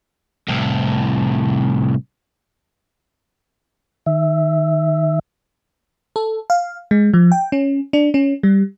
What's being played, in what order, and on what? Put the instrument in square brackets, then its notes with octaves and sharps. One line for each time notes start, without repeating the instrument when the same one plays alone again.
[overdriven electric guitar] C2 A2
[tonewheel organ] D#3 E5
[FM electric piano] A4
F5
G#3
F3
G5
C#4
D4
C#4
G3